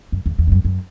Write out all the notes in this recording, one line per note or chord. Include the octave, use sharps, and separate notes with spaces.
F#2
E2
E2
G2
F#2
F#2